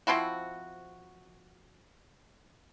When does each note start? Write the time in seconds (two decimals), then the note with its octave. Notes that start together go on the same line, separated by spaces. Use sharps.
0.07 F3 C4 E4 F#4